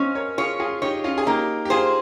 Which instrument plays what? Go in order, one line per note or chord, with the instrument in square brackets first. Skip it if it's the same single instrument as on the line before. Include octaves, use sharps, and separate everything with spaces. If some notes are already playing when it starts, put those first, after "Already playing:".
Already playing: [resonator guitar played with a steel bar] C#4 [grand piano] C5 D#5 F5
[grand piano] A#4 C#5
[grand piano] F4 G#4 [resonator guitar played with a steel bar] C#5
[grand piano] F4 G#4
[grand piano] D#4 G4 [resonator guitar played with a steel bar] C#5
[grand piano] C#4 F4
G#4
[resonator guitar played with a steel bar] A#3 [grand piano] D#4 G4
[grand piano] G4
[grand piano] F4 G#4 [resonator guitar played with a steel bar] C5